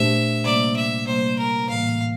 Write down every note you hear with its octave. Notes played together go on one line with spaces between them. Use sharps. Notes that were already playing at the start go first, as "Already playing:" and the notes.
Already playing: A#2 A3 D4 G4 C5 E5
C3 G3 A#3 D5
E5
C3 G3 A#3 C5
A#4
A2 E3 G3 A#3 F5